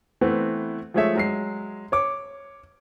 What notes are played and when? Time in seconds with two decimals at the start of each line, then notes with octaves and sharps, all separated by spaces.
0.21 E3 A3 B3 C4
0.94 F3 G#3 A3 G#4 C#5 E5
1.15 F#3 G#3 C7
1.92 C#5 D6